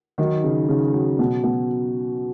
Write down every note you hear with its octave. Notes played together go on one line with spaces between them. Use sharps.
D#3 F#3 D#4
C#3
C#3
F#3
B2
B2